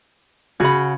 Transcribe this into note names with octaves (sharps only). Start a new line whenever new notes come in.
C#3 F#4 B5